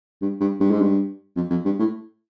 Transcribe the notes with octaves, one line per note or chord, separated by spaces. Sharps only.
G2
G2
G2
G#2
G2
F2
F2
G2
A2